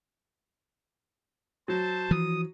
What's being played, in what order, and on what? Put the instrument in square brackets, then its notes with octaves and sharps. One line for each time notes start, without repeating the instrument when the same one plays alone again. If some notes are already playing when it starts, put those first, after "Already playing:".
[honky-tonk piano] F#3 [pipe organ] C5 A5
[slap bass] E3 F3 [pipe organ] D#6